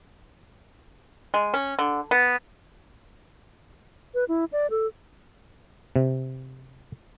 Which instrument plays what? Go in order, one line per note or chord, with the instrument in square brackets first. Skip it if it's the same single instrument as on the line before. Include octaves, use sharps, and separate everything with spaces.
[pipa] G#3
C#4
D3
B3
[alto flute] B4
E4
D5
A4
[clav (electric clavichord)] C3